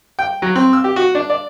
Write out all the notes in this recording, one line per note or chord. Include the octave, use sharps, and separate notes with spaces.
G5
F#3
C4
E6
G4
F#4
D4
D5